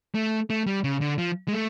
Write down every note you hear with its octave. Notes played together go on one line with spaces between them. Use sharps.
A3
A3
G3
C#3
D3
F3
G#3
A3